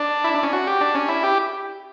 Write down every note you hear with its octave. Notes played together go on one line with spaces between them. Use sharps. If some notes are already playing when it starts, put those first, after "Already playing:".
Already playing: D4
E4
D4
C#4
F#4
G4
D4
C#4
E4
G4